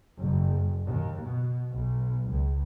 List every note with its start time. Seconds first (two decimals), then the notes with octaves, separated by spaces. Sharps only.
0.20 F#1
0.85 D#2
1.22 B2
1.72 B1
2.31 C#2